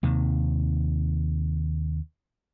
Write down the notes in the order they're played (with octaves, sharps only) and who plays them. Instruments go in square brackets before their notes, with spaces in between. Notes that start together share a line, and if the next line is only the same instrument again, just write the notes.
[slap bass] D#2 C3 D#3